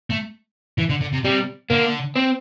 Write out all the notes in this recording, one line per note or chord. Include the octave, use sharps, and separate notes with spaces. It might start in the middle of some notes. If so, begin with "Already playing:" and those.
A3
E3
D3
D3
C3
C3 G3
D3 A#3
C4